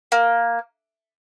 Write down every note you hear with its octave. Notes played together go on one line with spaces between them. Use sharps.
A#3